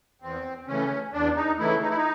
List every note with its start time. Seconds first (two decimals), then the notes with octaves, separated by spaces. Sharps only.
0.21 E2 C4
0.67 C#3 E3 A3 C#4
1.13 E2 D4
1.36 D#4
1.59 C#3 E3 A3 E4
1.82 D#4
1.89 E4
1.96 D#4